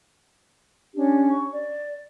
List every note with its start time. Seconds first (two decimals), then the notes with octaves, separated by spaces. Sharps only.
0.94 C#4 D4 G4
1.29 C#6
1.52 D5